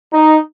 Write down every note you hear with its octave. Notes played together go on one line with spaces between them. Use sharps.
D#4